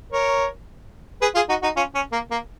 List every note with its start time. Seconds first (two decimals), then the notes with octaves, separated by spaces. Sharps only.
0.12 A#4 C#5
1.22 G#4 B4
1.35 F4 G#4
1.49 D#4 F#4
1.62 D#4 F#4
1.76 C#4 F4
1.95 C#4
2.12 A#3
2.31 A#3